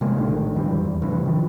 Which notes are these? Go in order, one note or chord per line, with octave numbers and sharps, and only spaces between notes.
C3 G#3 A#3
A#1 A2 D3 D#3
G#1 F2 E3 G3
E2
A1 G2 C3 E3
D#3 F3